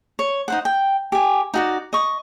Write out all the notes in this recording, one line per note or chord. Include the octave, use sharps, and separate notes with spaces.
C#5
D#4 C5 F#5
G5
G4 G#5
D#4 F#4 D5
D#5 C#6